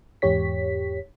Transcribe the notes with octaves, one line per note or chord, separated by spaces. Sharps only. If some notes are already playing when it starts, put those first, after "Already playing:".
E2 G#2 G4 C#5 B6